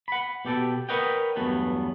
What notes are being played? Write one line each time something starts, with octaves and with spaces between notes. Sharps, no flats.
F#5 B5
B2 G4 A4 G5
A#4 B4 C#5 D#5 F#5 G5
E2 G2 F#3 A3 B3